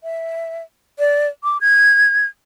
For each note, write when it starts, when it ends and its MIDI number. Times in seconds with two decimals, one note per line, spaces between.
0.03 0.62 76
0.99 1.27 74
1.44 1.58 86
1.61 2.27 92